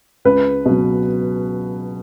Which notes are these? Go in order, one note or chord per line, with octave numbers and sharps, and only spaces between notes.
C#2 B4
B2 F#3